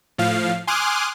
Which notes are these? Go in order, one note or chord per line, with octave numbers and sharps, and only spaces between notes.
A2 F3 F5
G#5 C6 D6 D#6 F6 F#6